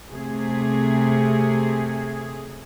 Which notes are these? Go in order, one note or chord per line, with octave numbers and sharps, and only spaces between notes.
C3 A3 G#4